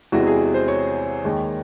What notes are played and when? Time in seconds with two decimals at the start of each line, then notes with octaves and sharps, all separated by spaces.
0.12 E2 C3 E3 G#3 F#4
0.27 G#4
0.54 C5
0.68 C#5
1.24 D#2 D#3 G#3